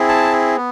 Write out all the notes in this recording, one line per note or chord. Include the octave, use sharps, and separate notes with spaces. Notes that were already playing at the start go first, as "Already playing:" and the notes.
Already playing: C4 E4 G#4
A5
B3